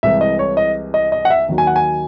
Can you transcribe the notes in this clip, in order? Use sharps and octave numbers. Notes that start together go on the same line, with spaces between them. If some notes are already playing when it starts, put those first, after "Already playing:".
C2 C3 E3 G#3 E5
D#5
C#5
D#5
D#5
D#5
F#5
E5
D#2 D#3 F#3
G#5
F#5
G#5